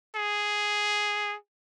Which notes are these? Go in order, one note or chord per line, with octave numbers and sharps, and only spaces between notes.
G#4